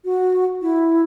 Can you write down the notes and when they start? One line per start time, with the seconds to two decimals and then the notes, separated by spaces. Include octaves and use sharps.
0.05 F#4
0.62 E4